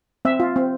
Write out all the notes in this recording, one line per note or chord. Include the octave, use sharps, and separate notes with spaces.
C4 E5
F4
C4